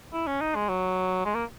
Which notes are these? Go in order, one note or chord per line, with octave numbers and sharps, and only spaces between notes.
E4
C#4
D#4
G#3
F#3
G#3
A#3